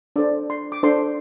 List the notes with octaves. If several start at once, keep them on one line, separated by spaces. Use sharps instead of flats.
D4 A4 C5 D5
C6
D6
D4 A4 C5 C6